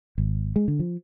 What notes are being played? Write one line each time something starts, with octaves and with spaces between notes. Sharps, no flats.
G#1
G#3
D3
F3